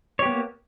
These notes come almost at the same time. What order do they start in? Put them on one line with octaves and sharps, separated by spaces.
C#5 G4 B3 A#3